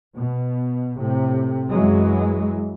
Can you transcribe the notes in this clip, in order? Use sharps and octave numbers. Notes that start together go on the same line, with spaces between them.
B2
A2 C3
F#2 E3 F#3 G#3